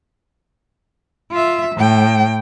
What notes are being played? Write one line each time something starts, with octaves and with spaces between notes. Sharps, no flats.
F4 E5
A2 G5